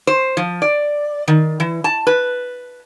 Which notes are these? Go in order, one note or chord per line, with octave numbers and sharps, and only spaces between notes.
C5
F3
D5
D#3
E3
A5
B4